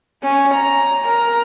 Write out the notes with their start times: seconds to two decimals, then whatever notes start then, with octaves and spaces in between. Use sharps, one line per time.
0.23 C#4
0.55 A#5
1.08 A#4